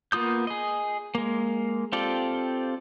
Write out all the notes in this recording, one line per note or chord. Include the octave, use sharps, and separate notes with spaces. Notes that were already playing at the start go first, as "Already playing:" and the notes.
A#3 B3 F4 D#6 G6
G#4 D#5
G#3 A#3
C4 F4 G4 A4 D5